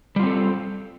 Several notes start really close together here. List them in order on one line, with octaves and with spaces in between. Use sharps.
G3 F4 C4 A4